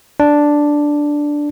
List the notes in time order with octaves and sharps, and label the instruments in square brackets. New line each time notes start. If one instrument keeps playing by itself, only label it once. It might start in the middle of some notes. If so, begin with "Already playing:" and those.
[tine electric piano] D4